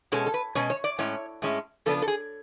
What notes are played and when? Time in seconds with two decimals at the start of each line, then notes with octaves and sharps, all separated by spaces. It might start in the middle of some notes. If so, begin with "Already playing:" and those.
0.12 B2 G#3 C#4 A4
0.26 A4
0.34 B4
0.55 B2 G#3 C#4 C#5
0.70 C#5
0.84 D5
0.99 A2 G#3 C#4 C#5
1.42 A2 G#3 C#4
1.86 C#3 F3 B3 D4 A4
2.02 A4
2.08 G#4